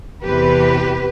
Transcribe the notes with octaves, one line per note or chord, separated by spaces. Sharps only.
E2 C3 E3 G4 B4